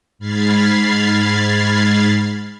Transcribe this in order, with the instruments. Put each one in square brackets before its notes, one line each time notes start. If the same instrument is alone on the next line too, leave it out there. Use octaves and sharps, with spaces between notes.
[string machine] G#2 B5 F6 G#6 A6 C7